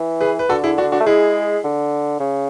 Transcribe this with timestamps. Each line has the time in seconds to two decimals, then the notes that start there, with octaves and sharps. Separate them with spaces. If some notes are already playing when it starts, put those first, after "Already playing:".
Already playing: E3
0.21 G#4 B4
0.39 B4
0.49 D3 F#4 A4
0.64 E4 G#4
0.78 D4 F#4
0.92 D4 F#4
1.00 A3
1.06 G#3 E4 G#4
1.64 D3
2.20 C#3